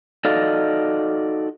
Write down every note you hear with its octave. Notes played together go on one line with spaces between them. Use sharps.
D#4 F#4 A4 D5 D#5 F5